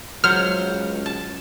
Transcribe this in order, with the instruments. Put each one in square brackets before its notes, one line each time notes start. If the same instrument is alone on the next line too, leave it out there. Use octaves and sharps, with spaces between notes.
[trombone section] C#2 [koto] F#3 C5 F#5 [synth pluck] F6
[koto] A5